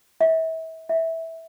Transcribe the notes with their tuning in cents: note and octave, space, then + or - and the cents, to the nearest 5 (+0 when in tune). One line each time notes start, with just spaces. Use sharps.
E5 -35
E5 -15